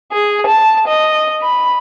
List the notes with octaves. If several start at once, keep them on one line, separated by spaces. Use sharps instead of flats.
G#4
A5
D#5
B5